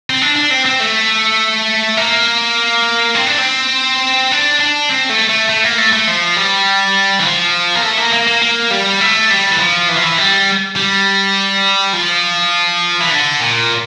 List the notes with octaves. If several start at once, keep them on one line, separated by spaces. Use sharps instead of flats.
C4
D4
D4
C4
C4
A3
A#3
C4
D4
C4
D4
D4
C4
A3
A3
A3
A#3
A3
A3
F3
G3
E3
F3
A#3
A3
A#3
A#3
A#3
A#3
G3
A3
G3
E3
F3
E3
F3
E3
G3
G3
F3
E3
D3
A#2